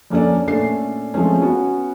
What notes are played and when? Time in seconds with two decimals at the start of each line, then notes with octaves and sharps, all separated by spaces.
0.10 F2 A#3 C#4 D4 A4 D5
0.47 A#2 A3 C#4 D4 A4 C7
1.14 F3 G#3 A3 C4 C#4
1.41 B3 C#4 F#4